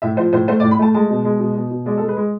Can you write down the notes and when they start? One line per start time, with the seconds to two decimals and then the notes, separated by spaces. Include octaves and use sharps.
0.02 A2 E5
0.17 F3 C5
0.33 A2 C5
0.48 A3 C5
0.60 D5
0.63 A2
0.71 B5
0.79 A3 A5
0.94 G#3 A5
1.10 B2
1.25 G#3
1.40 B2
1.55 B2
1.71 B2
1.86 G#3 D5
1.97 A4
2.02 G#3
2.08 B4
2.16 G#3